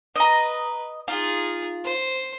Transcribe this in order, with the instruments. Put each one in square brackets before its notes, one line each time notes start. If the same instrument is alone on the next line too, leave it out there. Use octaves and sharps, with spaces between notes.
[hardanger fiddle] B4 [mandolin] D#5 A#5
[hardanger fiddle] D#4 G#4 [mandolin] F4
[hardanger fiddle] C5